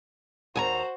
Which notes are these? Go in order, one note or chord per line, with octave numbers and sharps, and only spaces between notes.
D#2 F#4 C5 G#5 A#5